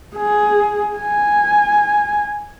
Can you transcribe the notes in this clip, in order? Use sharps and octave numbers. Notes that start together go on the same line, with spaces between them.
G#4
G#5